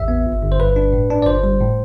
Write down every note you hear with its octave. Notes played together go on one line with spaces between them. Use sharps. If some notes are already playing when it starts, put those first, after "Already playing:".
Already playing: A1 E2 E5
B3
G1
G1
C5
G2 B4
D4
A2
D4
D5
G1 C5
G3
A2